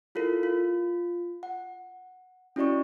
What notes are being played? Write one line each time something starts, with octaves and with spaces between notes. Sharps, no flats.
E4 F4 A4 A#4
F4
F#5
C#4 E4 F#4 D5 D#5 C#6